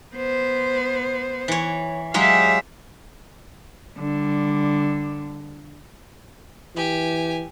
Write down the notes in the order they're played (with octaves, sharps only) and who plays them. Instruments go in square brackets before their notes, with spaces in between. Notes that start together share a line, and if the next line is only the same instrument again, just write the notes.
[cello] B3 C5
[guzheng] E3 C#5
[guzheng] F#3 G#3 G4 [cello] E5 F5
[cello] D3 G3
[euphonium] E3 [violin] G4 G#5